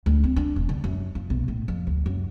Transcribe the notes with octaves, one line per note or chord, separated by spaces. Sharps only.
D2
C4
D4
E1
D3
F#2
F3
B1
A2
F2
D2
F#2